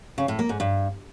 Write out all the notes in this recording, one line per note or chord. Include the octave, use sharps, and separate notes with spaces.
C#3
A2
A#3
G#2
G2